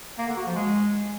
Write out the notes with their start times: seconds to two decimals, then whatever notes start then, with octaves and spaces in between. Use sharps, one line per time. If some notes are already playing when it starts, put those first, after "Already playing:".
0.18 A#3
0.27 D3
0.37 F#4
0.46 F3
0.55 G#3